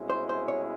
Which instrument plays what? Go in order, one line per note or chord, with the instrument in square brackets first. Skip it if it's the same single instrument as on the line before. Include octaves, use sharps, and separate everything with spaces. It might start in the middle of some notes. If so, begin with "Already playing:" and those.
Already playing: [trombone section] C2 B2 G#3 C#4 E4
[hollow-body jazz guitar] C5
C5
C#5